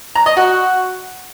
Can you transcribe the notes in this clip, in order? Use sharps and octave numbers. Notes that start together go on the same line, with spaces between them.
A#5
D#5
F#4